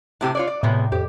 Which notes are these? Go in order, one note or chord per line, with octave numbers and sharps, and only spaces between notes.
A2 C3 G4 F#6
F4 C#5 D5
D5
A2 C3 G3 G#3 B3
F2 G4